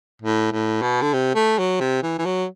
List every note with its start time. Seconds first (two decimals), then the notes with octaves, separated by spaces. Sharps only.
0.22 A2
0.52 A2
0.82 B2
1.02 D3
1.13 C3
1.35 A3
1.59 F#3
1.80 C3
2.03 E3
2.19 E3
2.25 F#3